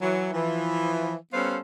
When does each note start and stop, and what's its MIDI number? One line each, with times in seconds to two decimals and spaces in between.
0.01 0.32 52
0.01 0.32 54
0.34 1.15 52
0.34 1.15 53
1.34 1.58 55
1.34 1.58 59
1.34 1.58 61
1.34 1.58 69
1.34 1.58 72
1.34 1.58 77